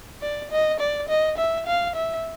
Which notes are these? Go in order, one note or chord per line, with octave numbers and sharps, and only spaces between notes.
D5
D#5
D5
D#5
E5
F5
E5